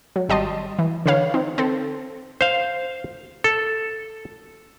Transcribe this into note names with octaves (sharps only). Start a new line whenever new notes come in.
F#3
G#1 G3 D#5 A5 C6
E3
D3 E3 B4 C#5 F5
C4 D#4
C4 A4
C5 F5
A4